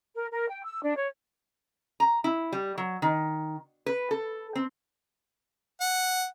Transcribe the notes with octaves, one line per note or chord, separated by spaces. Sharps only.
A#4
A#4
G5
E6
D4
C#5
A#5
E4
G3
F#3
D#3
B4
A4
C4
F#5